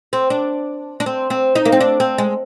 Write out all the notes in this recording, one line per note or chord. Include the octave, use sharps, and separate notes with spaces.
C4
D4
D4
C4
C4
D#4
A#3
C4
D4
C4
G#3